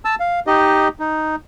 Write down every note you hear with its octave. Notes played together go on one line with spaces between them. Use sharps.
A5 E6
F5
D#4 G4 D#5
D#4